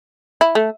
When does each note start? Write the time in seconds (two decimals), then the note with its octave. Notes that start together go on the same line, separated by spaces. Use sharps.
0.41 E4
0.55 A3